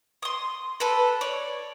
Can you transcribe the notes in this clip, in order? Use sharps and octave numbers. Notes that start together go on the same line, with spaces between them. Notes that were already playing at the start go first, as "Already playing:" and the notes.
C6 D#6
A4 B4
C#5 D5